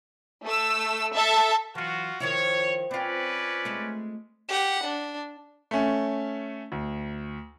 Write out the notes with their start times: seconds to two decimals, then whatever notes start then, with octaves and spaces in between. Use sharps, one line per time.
0.45 A3 E6
1.15 A4 E5 A5
1.75 E3 F#3 F4 F#4
2.20 D#3 F3 E4 C#5
2.91 C4 C#4 F4 B4 D5
3.65 G#3 A3
4.49 G4 F#5
4.85 D4
5.71 A3 C#4
6.72 D2